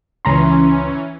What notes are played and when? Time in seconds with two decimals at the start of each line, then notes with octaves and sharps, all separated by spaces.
0.25 C#2 E3 C#4 A#5 C6